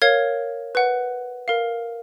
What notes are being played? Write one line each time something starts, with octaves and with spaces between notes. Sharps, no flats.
A#4 C#5 F5 G#6
B4 F#5
A#4 F5